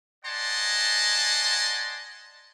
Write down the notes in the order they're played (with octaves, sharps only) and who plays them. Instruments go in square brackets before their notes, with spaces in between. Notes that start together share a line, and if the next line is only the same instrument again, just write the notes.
[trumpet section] D5 D#5 F#5 G#5 A5 C6